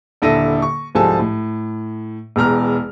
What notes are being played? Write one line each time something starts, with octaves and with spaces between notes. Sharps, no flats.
D#1 D3 E4 A4 A#6 D#7
C#6
C2 G#2 F3 A4 G#5 A5
A2
E1 E2 A#5 F6